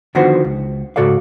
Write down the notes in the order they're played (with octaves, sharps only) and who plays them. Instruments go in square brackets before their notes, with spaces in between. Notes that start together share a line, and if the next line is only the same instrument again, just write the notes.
[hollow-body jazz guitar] D3 D#3 F3 B3 F#4 C5
C#2
G#2 C#3 F#4 A4 D5 F5